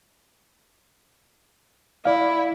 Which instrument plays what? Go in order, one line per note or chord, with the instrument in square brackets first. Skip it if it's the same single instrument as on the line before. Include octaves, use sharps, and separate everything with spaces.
[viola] E4 [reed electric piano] D5 F5